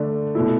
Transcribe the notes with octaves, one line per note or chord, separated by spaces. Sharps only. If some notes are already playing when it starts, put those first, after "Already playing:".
Already playing: D3 A3 D4
B2 A3 E4